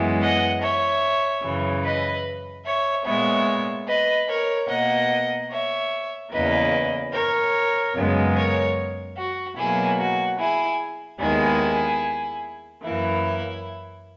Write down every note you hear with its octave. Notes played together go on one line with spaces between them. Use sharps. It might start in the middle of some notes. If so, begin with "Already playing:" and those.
Already playing: F#2 E3 G#3 B3
D#5 F#5
C#5 E5
F#2 C#3 E3
B4 D#5
C#5 E5
A#2 G#3 B3 C#5 E5
B4 D#5
A#4 C#5
B2 A#3 D#5 F#5
C#5 E5
E2 C#3 E3 A#3 B4 D#5
A#4 C#5
F#2 C#3 G#3 B3
A#4 C#5
F#4
B2 F#3 A#3 E4 G#4
F#4
E4 G#4
D#2 D#3 G#3 B3 E4 G#4
F#2 E3 A#3 E4